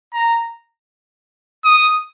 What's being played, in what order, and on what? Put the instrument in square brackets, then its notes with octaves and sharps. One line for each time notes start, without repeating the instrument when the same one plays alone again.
[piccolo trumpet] A#5
D#6